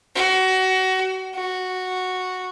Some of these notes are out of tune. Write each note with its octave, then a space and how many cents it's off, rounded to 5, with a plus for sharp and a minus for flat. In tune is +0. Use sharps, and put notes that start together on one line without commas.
F#4 +25
F#4 -5